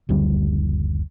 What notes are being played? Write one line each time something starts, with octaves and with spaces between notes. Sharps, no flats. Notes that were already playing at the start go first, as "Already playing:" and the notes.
F#1 D2 D3 G3